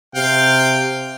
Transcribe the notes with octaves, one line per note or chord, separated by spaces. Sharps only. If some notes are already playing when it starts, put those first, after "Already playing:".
C3 F5 G5